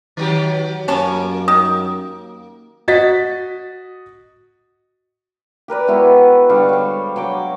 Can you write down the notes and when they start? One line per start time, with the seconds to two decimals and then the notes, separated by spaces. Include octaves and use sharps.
0.17 D#3 F#3 G4
0.88 F#2 A#3 C#4 C#5 A5
1.48 D#3 D#6
2.88 F#4 D#5 A6 B6
5.68 G4 A#4 B4 D5
5.87 G#3 B3 E4 F#4
6.49 D3 G3 F5 C#6
6.69 C5 C#5
7.16 F#3 C#5 G5 D6